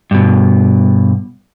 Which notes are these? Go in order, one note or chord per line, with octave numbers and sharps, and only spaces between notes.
G2 B2